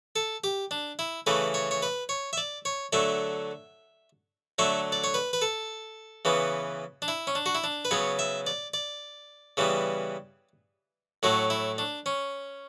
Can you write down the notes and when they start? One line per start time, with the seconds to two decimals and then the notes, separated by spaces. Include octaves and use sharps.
0.16 A4
0.44 G4
0.71 D4
0.99 E4
1.26 C#3 E3 A3 B4
1.54 C#5
1.71 C#5
1.82 B4
2.09 C#5
2.33 E5
2.37 D5
2.65 C#5
2.93 D3 F#3 A3 E5
4.58 D3 F#3 A3 E5
4.92 D5
5.04 C#5
5.14 B4
5.33 B4
5.42 A4
6.25 C#3 E3 B3
7.02 D4
7.08 E4
7.27 C#4
7.35 D4
7.46 F#4
7.55 E4
7.64 D4
7.85 B4
7.91 C#3 F#3 B3 C#5
8.19 E5
8.47 D5
8.74 D5
9.57 C#3 E3 G3 B3
11.23 A2 F#3 A3 F#4
11.50 E4
11.78 D4
12.06 C#4